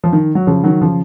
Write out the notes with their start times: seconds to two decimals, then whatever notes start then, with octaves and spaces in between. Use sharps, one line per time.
0.04 F3
0.13 D#3
0.35 F#3
0.47 C#3 F3
0.64 D#3 F#3
0.81 C#3 F3